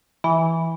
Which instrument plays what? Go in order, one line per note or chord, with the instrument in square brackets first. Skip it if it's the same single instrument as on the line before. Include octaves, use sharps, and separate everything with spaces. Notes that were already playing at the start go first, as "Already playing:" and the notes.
[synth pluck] E3